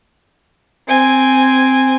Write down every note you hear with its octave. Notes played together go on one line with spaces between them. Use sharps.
C4 G#5